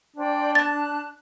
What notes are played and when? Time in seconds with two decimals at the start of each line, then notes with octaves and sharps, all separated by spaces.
0.17 D4 C5 D5 G5
0.55 A5 F#6 A6